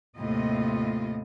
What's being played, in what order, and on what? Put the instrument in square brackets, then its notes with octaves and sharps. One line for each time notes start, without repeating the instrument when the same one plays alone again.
[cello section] D#2 F4 D#5 [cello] A2 C3